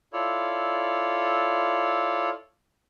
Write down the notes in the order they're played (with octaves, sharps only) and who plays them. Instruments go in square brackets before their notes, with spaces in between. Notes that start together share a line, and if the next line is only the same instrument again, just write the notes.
[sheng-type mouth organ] E4 F4 A4 C#5 D5